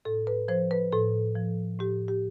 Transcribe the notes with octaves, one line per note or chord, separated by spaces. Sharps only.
A2 A4
B4
F3 C5
B4
A2 A4
F3
A2 G4
G4